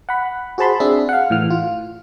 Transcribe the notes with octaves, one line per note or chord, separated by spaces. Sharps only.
F#5 B5
F#4 G#4 C5 A5 B5 C6
C4 D4 G#4 E5
F5 F#5
A2 E3 F6
F4